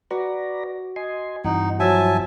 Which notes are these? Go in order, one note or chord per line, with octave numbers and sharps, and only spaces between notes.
F#4 B4 D5 A#5
D#5 G#5 C6
G2 E3 C4 D#4 F#5
F3 F#3 F4 E5 G#5 A5